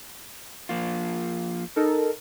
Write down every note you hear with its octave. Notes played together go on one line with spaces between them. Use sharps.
F3 A#3 F4
D#4 A4 A#4